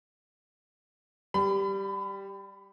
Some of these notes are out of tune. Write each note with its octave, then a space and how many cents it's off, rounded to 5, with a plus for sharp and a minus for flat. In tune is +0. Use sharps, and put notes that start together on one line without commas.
G3 +0 B5 +30